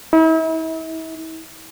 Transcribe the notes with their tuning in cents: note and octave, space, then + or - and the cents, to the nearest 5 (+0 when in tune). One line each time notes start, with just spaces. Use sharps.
E4 -40